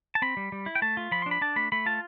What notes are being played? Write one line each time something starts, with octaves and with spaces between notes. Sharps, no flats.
A5
C4 B5
G3
G3
E4
G5
A3 A5
F4
F3 B5
C6
D4
B5
D4 A5
A3 B5
A3 B5
F4 A5